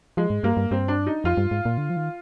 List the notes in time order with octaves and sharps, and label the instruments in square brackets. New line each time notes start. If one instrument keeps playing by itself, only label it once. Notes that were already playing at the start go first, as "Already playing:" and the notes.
[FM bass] F3 [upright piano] G#3
[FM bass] G#2
[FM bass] G2 [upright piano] A#3
[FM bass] G2
[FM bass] G2 [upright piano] C4
[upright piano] D4
D#4
[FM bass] F2 [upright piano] F4
[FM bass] G2
G#2
A#2
D3
F3
D#3